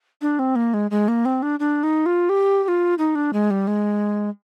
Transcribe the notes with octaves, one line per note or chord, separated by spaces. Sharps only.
D4
C4
A#3
G#3
G#3
A#3
C4
D4
D4
D#4
F4
G4
G4
F4
D#4
D4
G#3
G3
G#3